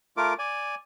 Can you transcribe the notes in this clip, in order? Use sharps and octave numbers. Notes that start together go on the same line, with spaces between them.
A3 F4 A#4 D6
D5 G#5